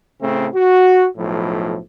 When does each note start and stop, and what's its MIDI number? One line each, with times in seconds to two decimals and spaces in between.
0.21 0.48 45
0.21 0.48 49
0.21 0.48 57
0.21 0.48 60
0.54 1.06 66
1.17 1.78 35
1.17 1.78 45
1.17 1.78 53